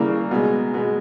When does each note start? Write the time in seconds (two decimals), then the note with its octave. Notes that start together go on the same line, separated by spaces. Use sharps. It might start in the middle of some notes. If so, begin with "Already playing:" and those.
Already playing: C#3 E3 G3 A#3 A#4
0.31 B2 G#3
0.74 B2 G#3